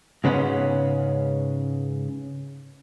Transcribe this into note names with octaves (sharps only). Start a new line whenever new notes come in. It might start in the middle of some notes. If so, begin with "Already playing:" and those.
G#2 C#3 G#3 B3 C#4